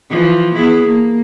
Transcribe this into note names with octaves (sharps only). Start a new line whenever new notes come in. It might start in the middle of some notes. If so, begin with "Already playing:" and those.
E3 F3
B3 E4 G#4
A#3